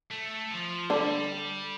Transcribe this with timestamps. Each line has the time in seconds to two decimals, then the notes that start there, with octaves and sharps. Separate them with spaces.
0.11 A3
0.51 F3
0.90 D3 G3 D4